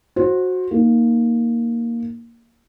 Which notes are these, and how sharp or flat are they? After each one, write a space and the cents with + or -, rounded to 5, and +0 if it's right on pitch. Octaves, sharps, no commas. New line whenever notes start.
F#4 -10 C5 +20
A#3 +0 D#4 +0